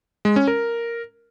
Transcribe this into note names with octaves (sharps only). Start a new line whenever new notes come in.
G#3
C#4
A#4